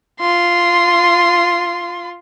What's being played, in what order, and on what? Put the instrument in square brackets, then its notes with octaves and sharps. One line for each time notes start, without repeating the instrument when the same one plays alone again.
[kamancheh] F4 C6